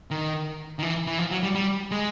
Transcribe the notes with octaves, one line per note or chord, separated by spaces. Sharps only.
D#3
D#3
E3
E3
F3
F#3
G3
G3
G#3